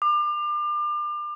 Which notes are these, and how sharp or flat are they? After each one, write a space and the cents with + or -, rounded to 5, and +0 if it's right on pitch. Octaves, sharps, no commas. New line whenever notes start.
D6 +35